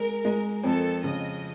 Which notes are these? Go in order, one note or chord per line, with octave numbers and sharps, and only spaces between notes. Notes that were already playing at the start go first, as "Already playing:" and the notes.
Already playing: G#3 A#4
G#3
F2 A4
C#3 D#5